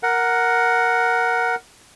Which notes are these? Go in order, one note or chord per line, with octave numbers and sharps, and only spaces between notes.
A#4 F#5